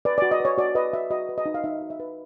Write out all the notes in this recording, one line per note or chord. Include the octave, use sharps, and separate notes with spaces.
B4 D5
F#4 D5
D#5
B4 C#5
F#4 D5
B4 D#5
F#4 E5
F#4 D#5
B4
D#5
D#4
F5
D#4 E5
F#4
E5
B4